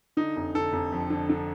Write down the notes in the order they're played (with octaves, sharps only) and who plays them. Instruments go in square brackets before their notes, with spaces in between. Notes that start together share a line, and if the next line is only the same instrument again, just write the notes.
[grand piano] D3 D#4
F1
D3 A4
F1
F2
D3
D3